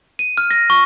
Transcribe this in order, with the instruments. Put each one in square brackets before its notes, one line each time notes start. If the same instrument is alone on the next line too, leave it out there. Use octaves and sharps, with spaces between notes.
[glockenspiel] D#7
F6
A#6
C#6